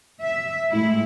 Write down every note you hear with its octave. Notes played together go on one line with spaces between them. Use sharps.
E5
A2 G#3 E4